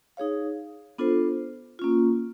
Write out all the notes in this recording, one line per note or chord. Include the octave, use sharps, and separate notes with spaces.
D#4 G#4 C#5 F5
B3 D4 F4 A4 C5
A#3 C#4 F4